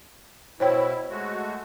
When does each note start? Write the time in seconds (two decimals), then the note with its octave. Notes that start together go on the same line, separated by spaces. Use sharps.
0.60 B2 E4 C5 C#5 G5
1.10 G#3 A3 F#4